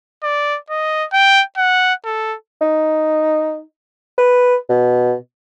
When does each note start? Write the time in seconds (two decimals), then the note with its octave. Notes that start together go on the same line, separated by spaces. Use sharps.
0.23 D5
0.70 D#5
1.12 G5
1.57 F#5
2.05 A4
2.61 D#4
4.18 B4
4.69 B2